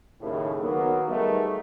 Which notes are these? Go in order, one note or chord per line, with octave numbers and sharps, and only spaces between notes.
D#2 A2 C#3
D#3 F#3 A#3 B3
G3 A3 B3 D#4 G#4 A#4